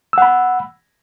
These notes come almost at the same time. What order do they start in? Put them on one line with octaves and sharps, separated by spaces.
E6 F#5 B5